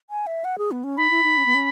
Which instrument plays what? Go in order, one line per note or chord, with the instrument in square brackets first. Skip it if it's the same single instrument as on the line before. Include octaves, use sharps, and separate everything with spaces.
[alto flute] G#5
E5
F#5
G#4
B3
C#4
[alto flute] D#4 [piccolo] B5
[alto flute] E4
D#4
C#4
B3
C#4